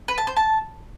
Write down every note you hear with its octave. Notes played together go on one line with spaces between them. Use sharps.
B4
A5
C5
A5